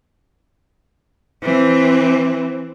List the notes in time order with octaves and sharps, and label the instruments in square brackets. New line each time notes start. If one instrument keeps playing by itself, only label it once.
[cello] E3 C4